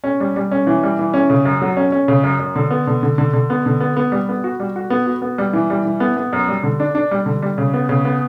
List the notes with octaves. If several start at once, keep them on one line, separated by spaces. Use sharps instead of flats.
C#4
G3
G3
C#4
E3
G3
E3
C#4
C#3
F#2
F#3
C#4
C#4
C#3
F#2
F#2
D3
B3
D3
D3
D3
D3
B3
D3
B3
B3
G3
B3
F#4
G3
F#4
B3
F#4
B3
G3
E3
G3
E3
B3
B3
F#2
G3
D3
D4
D4
G3
D3
G3
C#3
B3
C#3
B3